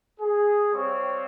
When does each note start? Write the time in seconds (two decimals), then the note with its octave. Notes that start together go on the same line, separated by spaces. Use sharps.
0.20 G#4
0.73 G3 C4 C#5 F5 C#6